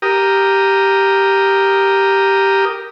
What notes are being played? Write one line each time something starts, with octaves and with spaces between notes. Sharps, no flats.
G4 A#4 D#6